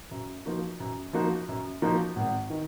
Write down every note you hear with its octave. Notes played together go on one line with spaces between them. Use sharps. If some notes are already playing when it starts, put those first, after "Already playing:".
F#2
F3 A#3 D#4 F#4
F#2
F3 A#3 D#4 F#4
F#2
F3 A#3 D#4 F#4
G#1
D#3